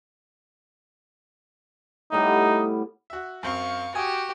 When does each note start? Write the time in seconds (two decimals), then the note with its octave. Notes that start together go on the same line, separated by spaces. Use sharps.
2.12 A2 G3 B3 D#4
3.10 F#4 E5
3.43 F#2 C4 C5 F5 C#6
3.95 F#4 G4 G#5 D#6